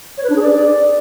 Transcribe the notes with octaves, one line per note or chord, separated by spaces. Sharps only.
C#5
B4
D4
G#4
D5